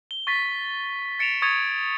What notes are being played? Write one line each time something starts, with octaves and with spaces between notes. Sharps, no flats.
G7
C#6 A6 B6
A6 C#7 D7 E7 F7
C#6 D#6 G#6 A6 C#7 F7